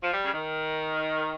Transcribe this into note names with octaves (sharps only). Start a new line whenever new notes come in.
F3
G3
C#3
D#3